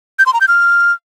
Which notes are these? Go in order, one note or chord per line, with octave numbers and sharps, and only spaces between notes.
G6
C6
A#5
G6
F6